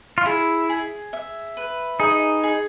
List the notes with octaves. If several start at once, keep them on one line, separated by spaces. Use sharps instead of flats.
F4
E4 G#4
G#4
E5
B4
D#4 G#4
G#4